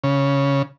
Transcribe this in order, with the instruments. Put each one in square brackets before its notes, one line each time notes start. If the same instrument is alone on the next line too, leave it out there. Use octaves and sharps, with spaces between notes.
[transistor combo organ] C#3